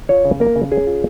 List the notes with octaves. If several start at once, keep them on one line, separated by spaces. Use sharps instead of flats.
F4 C#5
C#3
A#3 A#4
C#3
C#4 G#4
F4